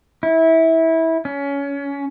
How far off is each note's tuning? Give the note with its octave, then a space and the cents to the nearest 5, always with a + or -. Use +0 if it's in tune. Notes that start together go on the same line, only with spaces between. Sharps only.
E4 -20
C#4 +20